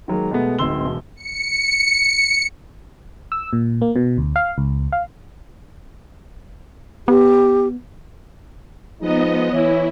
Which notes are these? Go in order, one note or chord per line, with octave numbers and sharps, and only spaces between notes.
D#3 F#3 G#3 A#3
B2 G#3 A3 B3
D1 G#2 C4 C6 E6 G7
E1
C#7
E6
A#2
A#3
B2
D2
F5
C#2
F5
B3 G4
F3 G#3 B3 D#4 D#5
E3 E4 C#5